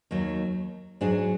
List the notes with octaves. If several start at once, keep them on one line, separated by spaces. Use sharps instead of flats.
D#2 D#3 F#3
G#2 F#3 D4 G#4